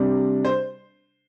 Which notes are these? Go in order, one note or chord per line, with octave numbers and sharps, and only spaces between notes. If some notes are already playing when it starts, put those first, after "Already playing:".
Already playing: C3 G3 D4
C5